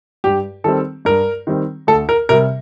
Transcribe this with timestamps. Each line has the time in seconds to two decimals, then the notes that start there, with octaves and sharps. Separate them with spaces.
0.24 G2 G4
0.64 D#3 G3 C4 A4
1.05 G2 A#4
1.47 D#3 G3 C4
1.87 D2 A4
2.09 A#4
2.29 C3 G3 A#4